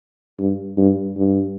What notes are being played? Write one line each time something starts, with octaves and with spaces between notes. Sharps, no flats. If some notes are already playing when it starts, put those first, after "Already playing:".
G2
G2
G2